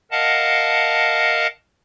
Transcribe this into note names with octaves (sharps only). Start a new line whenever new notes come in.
A#4 D#5 F5 F#5 A5